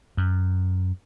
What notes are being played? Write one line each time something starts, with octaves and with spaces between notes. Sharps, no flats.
F#2